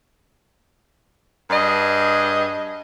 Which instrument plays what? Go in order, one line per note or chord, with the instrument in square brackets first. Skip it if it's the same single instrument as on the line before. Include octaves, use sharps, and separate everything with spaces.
[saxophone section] G2 G#4 D#5